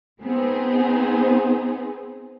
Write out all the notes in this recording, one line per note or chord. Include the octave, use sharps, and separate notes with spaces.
B3 C4 D#4 G#4 C5